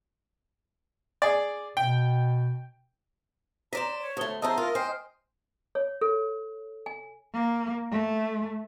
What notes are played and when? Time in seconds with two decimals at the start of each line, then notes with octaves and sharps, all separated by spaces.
1.22 G#4 D5
1.77 B2 G5
3.73 C5 D5 D#5 A#5 B6 E7
4.00 C#5
4.17 D2 A3 C5 D#6 G7
4.42 E2 A4 A#4 C5 D#5 E5 A5 E6
4.58 F4 A#4
4.75 C5 G5 G#5 F6 C7
5.75 C#5
6.01 A4
6.86 G#5
7.34 A#3
7.91 A3